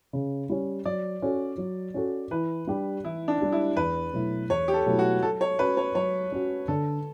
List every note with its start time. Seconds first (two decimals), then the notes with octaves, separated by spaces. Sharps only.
0.13 C#3
0.49 G3 C#4
0.85 F#3 D5
1.22 C#4 F#4 A4
1.58 F#3
1.94 C#4 F#4 A4
2.31 E3 B4
2.67 G3 D4 G4
3.04 E3 E4
3.28 D4
3.41 G3 D4 G4
3.52 E4
3.76 E2 B4
4.13 B2 F#3 A3 E4
4.49 E2 C#5
4.68 G4
4.74 A4
4.86 B2 F#3 A3 E4
4.99 F#4
5.23 F#3 A4
5.41 C#5
5.59 C#4 F#4 B4
5.77 C#5
5.95 F#3 C#5
6.32 C#4 F#4
6.68 D3 A4